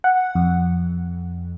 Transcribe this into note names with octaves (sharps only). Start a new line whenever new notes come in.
F#5
F2